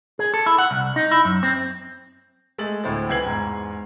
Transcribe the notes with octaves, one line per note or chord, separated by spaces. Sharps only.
G#4
A4
E4
F#5
C2
D#4
E4
F#2
C4
G#3 A3 E5 A6 F#7
D2 A2 E4 C5 A6
C#2 E3 G#6 C7 F#7
E2 G#2